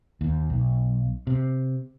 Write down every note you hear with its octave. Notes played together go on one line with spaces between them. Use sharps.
D#2
B1
C3